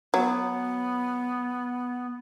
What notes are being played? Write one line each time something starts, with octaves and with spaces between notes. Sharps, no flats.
F#3 B3